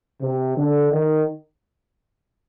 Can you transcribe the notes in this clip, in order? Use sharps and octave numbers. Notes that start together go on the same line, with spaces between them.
C3
D3
D#3